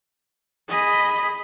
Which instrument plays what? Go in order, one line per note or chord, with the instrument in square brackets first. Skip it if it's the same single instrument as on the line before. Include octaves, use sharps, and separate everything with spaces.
[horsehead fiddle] G#4 B5 [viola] D#5